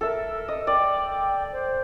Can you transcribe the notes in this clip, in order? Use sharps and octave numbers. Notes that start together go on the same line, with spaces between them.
A4 A#4 E5
D#5
D5 G5
C5